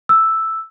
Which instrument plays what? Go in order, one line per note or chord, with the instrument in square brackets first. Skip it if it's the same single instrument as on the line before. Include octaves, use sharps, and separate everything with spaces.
[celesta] E6